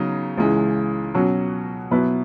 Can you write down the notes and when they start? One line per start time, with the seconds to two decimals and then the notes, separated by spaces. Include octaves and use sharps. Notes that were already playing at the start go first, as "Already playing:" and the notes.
Already playing: C#3 F#3 B3 D#4
0.38 C#2 C#3 E3 G#3
1.15 B2 F#3 C#4 F#4
1.91 B2 F#3 B3 E4 B4